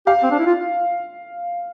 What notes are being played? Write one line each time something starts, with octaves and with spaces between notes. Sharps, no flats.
G4 F5
C4
D4
E4
F4